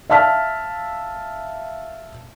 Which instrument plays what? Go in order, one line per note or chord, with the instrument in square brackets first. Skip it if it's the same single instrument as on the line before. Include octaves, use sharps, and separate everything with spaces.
[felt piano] E5 F5 A5 F6 B6